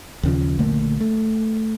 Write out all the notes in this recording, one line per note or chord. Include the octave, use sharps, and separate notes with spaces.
D#2 C#3 F3
A#1 D3 A3 A#3
A3